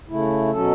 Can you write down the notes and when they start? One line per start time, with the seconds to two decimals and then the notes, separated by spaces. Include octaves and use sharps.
0.09 C#3 A3 E4
0.51 B2 F#3 C#4 A4